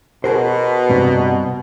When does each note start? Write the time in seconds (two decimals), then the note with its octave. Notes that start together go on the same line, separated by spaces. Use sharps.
0.24 B2 G#4 A#4 C5
0.89 C2 G2 C3